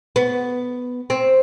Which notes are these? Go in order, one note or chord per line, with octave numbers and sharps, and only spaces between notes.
B3
C4